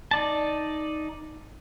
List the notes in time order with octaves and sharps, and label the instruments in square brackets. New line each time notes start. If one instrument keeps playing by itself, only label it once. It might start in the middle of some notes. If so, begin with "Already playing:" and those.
[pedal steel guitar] D#4 D5 A5